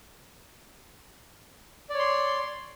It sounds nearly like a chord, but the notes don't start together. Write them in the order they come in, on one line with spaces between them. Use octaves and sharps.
D5 C#5 C6